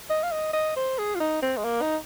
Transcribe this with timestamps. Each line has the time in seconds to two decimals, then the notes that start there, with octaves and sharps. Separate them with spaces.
0.10 D#5
0.23 F5
0.32 D#5
0.53 D#5
0.76 C5
0.99 G#4
1.15 F4
1.20 D#4
1.42 C4
1.57 G#3
1.64 A#3
1.82 D#4